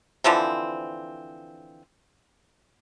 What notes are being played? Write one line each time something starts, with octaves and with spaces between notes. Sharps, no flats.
D3 E3 F3 C4